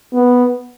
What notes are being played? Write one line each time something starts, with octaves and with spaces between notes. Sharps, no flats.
B3